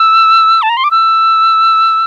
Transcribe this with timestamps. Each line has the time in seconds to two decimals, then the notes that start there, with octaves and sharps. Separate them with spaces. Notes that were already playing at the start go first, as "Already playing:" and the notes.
Already playing: E6
0.62 A5
0.70 A#5
0.77 C6
0.84 D6
0.91 E6